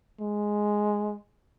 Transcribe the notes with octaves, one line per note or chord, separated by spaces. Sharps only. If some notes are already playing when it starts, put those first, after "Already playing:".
G#3